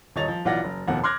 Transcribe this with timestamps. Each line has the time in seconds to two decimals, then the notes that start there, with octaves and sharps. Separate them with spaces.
0.16 D#1 C#5 D#5 A6 F7
0.28 F3
0.45 B1 E3 F4 D5 F#5 A#6
0.64 F#1
0.87 F1 D#2 B2 F#5
1.04 C6 D6 F6 F#6 G#6 A#6